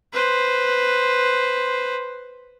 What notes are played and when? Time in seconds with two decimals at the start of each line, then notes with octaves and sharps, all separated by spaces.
0.13 B4 C5